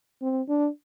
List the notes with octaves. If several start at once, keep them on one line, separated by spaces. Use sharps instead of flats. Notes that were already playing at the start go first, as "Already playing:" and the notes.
C4
D4